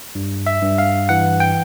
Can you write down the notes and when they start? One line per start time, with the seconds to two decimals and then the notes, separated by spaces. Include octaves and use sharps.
0.15 G2
0.47 E5
0.62 G2
0.78 F5
1.09 E3 F#5
1.40 G5